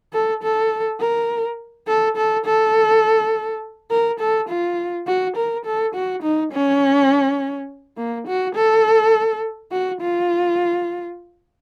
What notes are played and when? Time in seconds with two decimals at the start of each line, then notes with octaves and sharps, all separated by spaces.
0.13 A4
0.43 A4
1.01 A#4
1.88 A4
2.17 A4
2.46 A4
3.91 A#4
4.20 A4
4.49 F4
5.07 F#4
5.36 A#4
5.65 A4
5.95 F#4
6.23 D#4
6.52 C#4
7.98 A#3
8.27 F#4
8.55 A4
9.72 F#4
10.01 F4